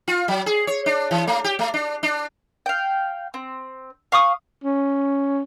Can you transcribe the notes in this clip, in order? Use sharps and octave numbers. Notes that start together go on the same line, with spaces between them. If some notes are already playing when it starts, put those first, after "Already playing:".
F4
F#3
G#4
C#5
D4
E3
A3
G4
A3
D4
D4
F5 G5
C4
F5 C#6 D#6
C#4